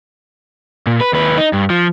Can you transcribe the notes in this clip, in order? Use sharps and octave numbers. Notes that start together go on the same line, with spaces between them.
A#2
B4
D#2 B4
D#4
G2
F3